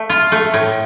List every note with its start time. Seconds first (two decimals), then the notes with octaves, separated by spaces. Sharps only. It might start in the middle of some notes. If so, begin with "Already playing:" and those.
Already playing: A3
0.09 F4
0.32 A3
0.54 A2